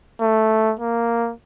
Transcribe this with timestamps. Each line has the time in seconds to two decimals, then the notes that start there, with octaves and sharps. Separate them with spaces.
0.21 A3
0.79 A#3